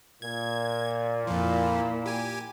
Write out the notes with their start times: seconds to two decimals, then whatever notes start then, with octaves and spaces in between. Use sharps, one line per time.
0.22 A#2 G#6
1.27 F2 F3 A#3 E4
2.06 G4 G#5